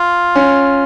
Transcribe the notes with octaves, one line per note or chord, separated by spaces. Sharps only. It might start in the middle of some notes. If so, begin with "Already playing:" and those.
Already playing: F4
C#4